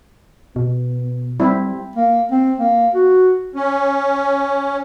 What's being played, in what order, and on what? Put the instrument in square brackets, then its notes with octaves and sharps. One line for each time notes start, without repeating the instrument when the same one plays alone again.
[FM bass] B2 [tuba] B3
[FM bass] G3 [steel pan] C4 E4
[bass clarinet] A#3
C4
A#3
F#4
[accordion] C#4